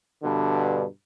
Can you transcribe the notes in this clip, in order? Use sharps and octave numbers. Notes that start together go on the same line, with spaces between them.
G2 B2 D3